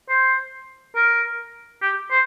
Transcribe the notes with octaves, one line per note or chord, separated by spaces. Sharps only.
C5
A#4
G4
C5